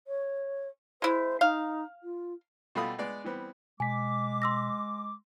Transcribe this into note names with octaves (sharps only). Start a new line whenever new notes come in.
C#5
G#3 E4 C5
D#4 F5
F4
B2 G3 A3 F4 B5 D#6
G#3 B3 D5
E3 G3 B3 C4
B2 G#3 G#5 D6 B6
C6 E6 A#6